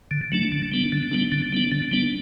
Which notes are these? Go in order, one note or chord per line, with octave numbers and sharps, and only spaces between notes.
D3
F#3 A3 D4
D3
G3 B3 D4
D3
G3 B3 D4
D3
G3 B3 D4
D3
G3 B3 D4